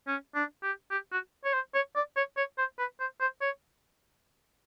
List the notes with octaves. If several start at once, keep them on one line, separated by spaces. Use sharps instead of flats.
C#4
D4
G4
G4
F#4
C#5
C5
C#5
D5
C#5
C#5
C5
B4
C5
C5
C#5